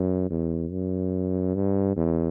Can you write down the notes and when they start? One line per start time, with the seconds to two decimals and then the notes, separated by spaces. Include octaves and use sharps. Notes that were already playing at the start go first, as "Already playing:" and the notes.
Already playing: F#2
0.30 E2
0.71 F#2
1.55 G2
1.97 E2